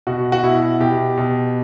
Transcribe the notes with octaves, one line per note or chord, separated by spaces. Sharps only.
B2 F#4
F#4
B2 E4
B2 G4
B2